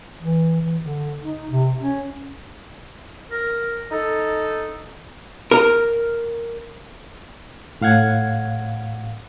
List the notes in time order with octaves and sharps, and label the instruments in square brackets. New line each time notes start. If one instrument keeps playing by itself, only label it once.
[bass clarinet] E3
E3
D3
D#4
C3
C#4
[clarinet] A#4
[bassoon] D#4 [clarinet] A4
[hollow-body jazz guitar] A#4
[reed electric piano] A2 F5 F#5 G#6